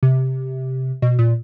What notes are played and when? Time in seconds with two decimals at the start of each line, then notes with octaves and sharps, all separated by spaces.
0.03 C3
1.02 B2
1.19 A#2